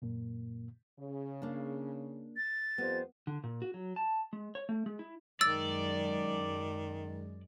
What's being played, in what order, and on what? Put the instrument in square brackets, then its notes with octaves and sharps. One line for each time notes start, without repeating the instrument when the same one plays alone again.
[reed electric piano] F#2 A#2 A#3
[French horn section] C#3
[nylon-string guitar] A#3 D4
[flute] A6
[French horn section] F2 G3 C5 [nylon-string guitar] B3
[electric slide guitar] D3
A#2
F#4
F#3
A5
G#3
C#5
A3
G#3
E4
[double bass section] F#2 G#3 [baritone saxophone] D#3 [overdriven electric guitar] D5 [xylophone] E6 A6